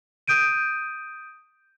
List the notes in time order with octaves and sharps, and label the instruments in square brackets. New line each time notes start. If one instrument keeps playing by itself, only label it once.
[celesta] D#6 G6 D7 D#7